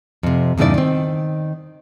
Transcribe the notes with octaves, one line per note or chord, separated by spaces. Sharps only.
F2 C3
E2 G2 C#3 D#4 E4 D5
D#3 C4